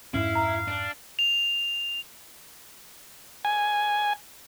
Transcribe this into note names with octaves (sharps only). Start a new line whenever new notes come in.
F2 G#2 C#4 E4 F5
A#5
D4
F7
G#5